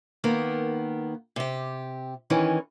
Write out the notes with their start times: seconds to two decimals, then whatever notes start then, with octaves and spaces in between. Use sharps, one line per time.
0.24 D#3 A#3 B3
1.36 C3 G4
2.30 D#3 E3 C#4